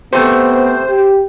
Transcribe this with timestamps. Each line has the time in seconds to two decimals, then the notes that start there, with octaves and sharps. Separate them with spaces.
0.13 C3 A3 B3 C5
0.88 G4